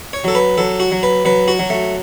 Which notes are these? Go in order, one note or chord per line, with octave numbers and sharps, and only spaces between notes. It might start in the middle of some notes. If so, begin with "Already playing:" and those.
C#5
F#3 A4
B4
F#3 A4
F#4
F#3
B4
F#3 B4
F#4
F#3
A3